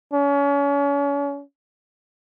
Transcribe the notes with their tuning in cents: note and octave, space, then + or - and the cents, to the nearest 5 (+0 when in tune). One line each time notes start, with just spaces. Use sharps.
C#4 +35